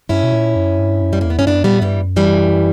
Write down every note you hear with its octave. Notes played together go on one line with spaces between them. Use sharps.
G2 C#4 E4
B2
A#2
F#2
G2
F#2
G3
E2 A#3
B3
G2 C#4
F#2 B3 D4
A#2 G3 B3
G2 E3 G3
F#2
E3 G3